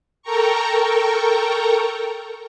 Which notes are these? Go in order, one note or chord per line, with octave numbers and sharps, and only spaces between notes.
A4 A#4 G5 A#5 C#6